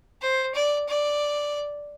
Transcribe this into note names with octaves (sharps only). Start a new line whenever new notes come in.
C5
D5
D5